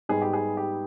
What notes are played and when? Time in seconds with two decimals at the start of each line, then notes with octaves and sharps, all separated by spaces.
0.09 G#2 G3 B3 G#4
0.22 G4
0.33 G#4
0.57 G4